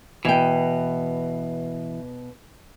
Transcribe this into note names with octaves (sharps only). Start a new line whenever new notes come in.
B2 E3 G5